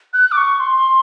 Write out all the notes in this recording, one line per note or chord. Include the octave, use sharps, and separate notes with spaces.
F#6
D6
C#6
C6